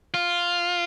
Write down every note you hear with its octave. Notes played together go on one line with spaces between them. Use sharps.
F4